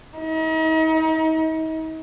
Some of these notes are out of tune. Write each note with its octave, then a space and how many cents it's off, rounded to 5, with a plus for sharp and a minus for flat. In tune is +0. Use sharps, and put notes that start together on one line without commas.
D#4 +40